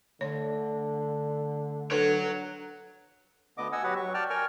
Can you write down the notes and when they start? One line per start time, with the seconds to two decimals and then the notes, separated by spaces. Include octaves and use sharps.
0.21 D2 D3 C#5
1.91 D4 A4 B4 C#5 F#5
3.58 D2 D3 B3 D#5 D6
3.72 D#5 F#5 G#5 E6
3.84 F#3 F#4 G4 B4 F#5
3.96 F#3 C#6
4.14 D5 G5 A5 F6
4.30 A#4 G5 G#5 C#6 F6